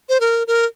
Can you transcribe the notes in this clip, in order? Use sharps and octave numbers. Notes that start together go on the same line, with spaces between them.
C5
A#4
A#4